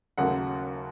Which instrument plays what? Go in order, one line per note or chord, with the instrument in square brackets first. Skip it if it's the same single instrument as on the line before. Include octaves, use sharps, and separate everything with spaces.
[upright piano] D#2 C#3 F#3 A3 F#5